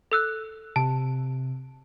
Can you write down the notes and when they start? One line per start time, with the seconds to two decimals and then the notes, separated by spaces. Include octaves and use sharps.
0.12 A4 E6 F#6
0.76 C3 A5